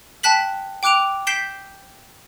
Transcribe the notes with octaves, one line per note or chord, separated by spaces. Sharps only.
G5 A5 F#6 B6 F#7
G5 D6 F#6 D7 F7
G6 B6 C7 D7 E7 G7